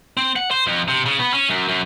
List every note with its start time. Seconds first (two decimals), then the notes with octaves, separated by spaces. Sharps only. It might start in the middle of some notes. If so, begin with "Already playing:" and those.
0.17 C4
0.36 F#5
0.51 C5
0.67 F2
0.88 C3
1.06 C#3
1.19 B3
1.34 C#4
1.50 F#2
1.69 F#2